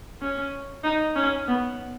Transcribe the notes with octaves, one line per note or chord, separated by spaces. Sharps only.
C#4
D#4
C#4
B3